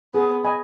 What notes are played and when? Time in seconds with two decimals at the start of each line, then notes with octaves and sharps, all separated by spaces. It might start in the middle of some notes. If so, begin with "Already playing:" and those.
0.14 B3 G#4
0.43 D#5 G#5 B5